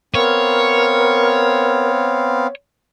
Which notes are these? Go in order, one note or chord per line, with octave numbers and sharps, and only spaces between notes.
B3 C4 A#4 C#5 F5